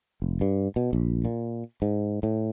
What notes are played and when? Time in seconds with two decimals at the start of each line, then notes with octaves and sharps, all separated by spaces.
0.22 F1
0.41 G2
0.76 B2
0.93 A#1
1.25 A#2
1.82 G#2
2.23 A2